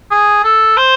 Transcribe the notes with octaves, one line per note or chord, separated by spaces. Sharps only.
G#4
A4
C5